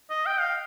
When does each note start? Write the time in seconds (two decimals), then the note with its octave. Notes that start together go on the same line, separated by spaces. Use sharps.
0.10 D#5
0.26 G5
0.40 F5